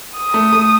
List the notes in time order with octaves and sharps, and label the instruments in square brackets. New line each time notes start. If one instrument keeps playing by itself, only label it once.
[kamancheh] D#6
[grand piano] A3
A3